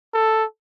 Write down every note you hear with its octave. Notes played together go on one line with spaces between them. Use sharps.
A4